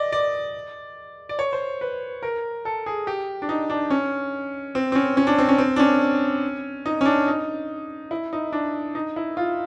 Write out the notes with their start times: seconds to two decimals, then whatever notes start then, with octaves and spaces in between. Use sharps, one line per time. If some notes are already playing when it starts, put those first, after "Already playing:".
Already playing: D5 D#5
0.12 D5
1.29 D5
1.39 C#5
1.53 C5
1.81 B4
2.23 A#4
2.65 A4
2.86 G#4
3.07 G4
3.42 D4
3.49 D#4
3.70 D4
3.90 C#4
4.75 C4
4.92 C4
4.95 C#4
5.17 C#4
5.27 D4
5.38 C4
5.49 C#4
5.58 C4
5.76 D4
5.80 C#4
6.86 D#4
7.01 C#4
7.05 D4
7.28 D#4
8.11 E4
8.33 D#4
8.52 D4
8.95 D#4
9.16 E4
9.37 F4